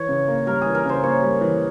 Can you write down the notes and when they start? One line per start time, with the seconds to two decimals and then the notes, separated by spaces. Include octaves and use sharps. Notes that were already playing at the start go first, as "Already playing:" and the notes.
Already playing: E3 C#5
0.08 C#3
0.28 A#3
0.46 G3 A#4
0.61 E3 G#4
0.75 A#4
0.85 C#3 C5
1.03 A#3 C#5
1.23 G3
1.41 E3